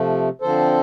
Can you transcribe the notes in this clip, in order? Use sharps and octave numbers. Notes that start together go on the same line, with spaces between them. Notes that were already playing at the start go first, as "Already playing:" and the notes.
Already playing: C3 F3 A3
D3 F3 C4 A4 C5